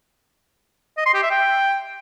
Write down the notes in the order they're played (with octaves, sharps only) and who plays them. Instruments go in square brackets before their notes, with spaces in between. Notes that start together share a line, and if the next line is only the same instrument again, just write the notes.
[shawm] D#5
C6
G4
E5
G5